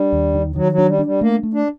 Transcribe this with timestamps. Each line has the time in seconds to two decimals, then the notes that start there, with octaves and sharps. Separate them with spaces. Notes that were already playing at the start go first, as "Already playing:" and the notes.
Already playing: G3 D4
0.12 D#2
0.35 D#3
0.55 D#3 F#3
0.72 F#3
0.78 D4
0.88 G3
0.99 D4
1.05 G3
1.21 A3 A#3
1.43 A3
1.53 D4